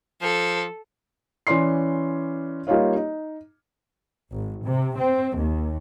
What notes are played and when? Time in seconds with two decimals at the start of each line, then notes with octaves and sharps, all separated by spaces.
0.22 F3 A4
1.47 E3 C#4 D5 C6 C7
2.67 G3 A#3 D#4 F4 C#5 F5
2.96 D#4
4.32 G#1
4.63 C3
4.97 C4
5.36 D#2